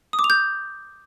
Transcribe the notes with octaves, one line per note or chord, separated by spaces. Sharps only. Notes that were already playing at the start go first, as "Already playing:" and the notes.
D#6
D6
F7
G6